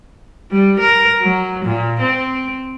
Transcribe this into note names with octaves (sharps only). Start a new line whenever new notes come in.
G3
A#4
F#3
A#2
C4